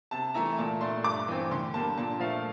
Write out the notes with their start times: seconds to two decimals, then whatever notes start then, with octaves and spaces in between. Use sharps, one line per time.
0.11 C3 A5
0.34 E3 A3 E4 A#5
0.58 A#2 A5
0.81 A3 D4 C6
1.04 G2 D6
1.28 E3 A3 C4
1.51 D3 C6
1.74 G3 A#3 A5
1.98 A#2 A5
2.20 F3 A3 F5